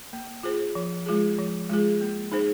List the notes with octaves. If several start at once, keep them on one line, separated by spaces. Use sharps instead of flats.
A#3
F4 G#4 C5
F3
G#3 F4 G#4
F3
G#3 F4 G#4
A#3
D#4 G#4 C5